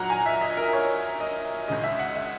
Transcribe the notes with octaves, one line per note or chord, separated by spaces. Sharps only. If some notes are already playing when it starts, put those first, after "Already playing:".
Already playing: A#2 F#3 F#5 A#5
G#5
E5
D#5
A#4
C#5
D#5
C#2 C#3 G#3 D#5
E5
F#5
E5